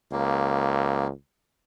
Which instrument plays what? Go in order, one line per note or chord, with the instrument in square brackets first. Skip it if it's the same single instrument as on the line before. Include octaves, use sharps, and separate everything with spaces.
[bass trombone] C#2 [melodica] A#3